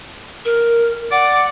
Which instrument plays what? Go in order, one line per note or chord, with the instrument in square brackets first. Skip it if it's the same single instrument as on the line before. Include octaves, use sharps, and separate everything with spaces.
[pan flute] A#4
[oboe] D5 [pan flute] F#5